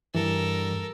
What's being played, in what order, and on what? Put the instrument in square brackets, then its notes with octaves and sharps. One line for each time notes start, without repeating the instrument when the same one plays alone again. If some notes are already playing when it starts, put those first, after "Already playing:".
[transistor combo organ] G2 [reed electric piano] E3 [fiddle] A4 A#4